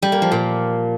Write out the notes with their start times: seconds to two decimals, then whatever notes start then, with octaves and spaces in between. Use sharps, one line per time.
0.02 G3
0.12 A#3
0.22 F3
0.32 A#2